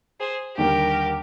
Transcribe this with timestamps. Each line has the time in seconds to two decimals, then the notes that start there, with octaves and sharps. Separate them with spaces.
0.20 G#4 C5
0.58 D#2 D3 G3 A#3 G4 A#4